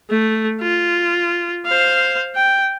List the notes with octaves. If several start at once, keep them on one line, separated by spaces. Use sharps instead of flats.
A3
F4
C5 F5
G5